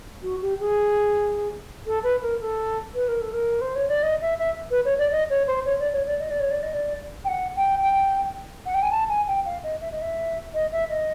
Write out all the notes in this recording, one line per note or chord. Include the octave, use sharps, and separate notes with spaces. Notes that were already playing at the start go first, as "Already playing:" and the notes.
F#4
G4
G#4
A4
B4
A#4
A4
B4
A#4
A4
A#4
C5
C#5
D5
D#5
E5
E5
B4
C#5
D5
D#5
C#5
C5
C#5
D5
C#5
D5
D#5
D5
C#5
D5
D#5
D5
G5
F#5
G5
G5
F#5
G5
G#5
A5
G#5
G5
F5
D#5
E5
D#5
E5
D#5
E5
D#5